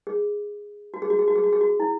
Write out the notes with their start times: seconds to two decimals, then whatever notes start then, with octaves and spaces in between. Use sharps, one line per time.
0.07 G#4
0.94 F#4
1.02 G#4
1.10 F#4
1.19 G#4
1.28 F#4
1.36 G#4
1.44 F#4
1.53 G#4
1.61 F#4
1.80 E4